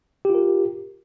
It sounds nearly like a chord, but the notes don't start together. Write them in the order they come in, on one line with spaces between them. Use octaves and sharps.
G4 F4 A#4